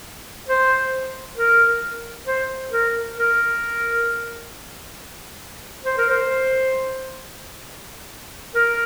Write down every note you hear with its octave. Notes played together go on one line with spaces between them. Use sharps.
C5
A#4
C5
A#4
A#4
C5
A#4
C5
A#4